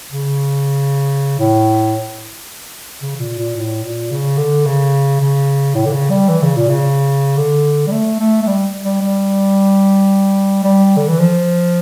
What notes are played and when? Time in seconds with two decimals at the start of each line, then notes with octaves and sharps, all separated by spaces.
0.11 C#3
1.39 A2
3.02 C#3
3.16 C#3
3.20 A#2
3.38 A#2
3.57 A2
3.84 A#2
4.11 C#3
4.38 D3
4.66 C#3
5.20 C#3
5.75 A2
5.85 D3
5.92 C#3
6.10 G3
6.29 E3
6.42 C#3
6.56 A#2
6.69 C#3
7.37 D3
7.87 G3
7.92 A3
8.19 A3
8.42 A3
8.47 G3
8.83 G3
9.01 G3
10.64 G3
10.97 D3
11.08 E3
11.19 F3